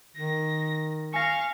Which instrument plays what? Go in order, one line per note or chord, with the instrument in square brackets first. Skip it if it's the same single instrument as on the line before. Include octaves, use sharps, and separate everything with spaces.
[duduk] D#3 [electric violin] A#6
[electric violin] F5 C#6 [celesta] G#5 A#6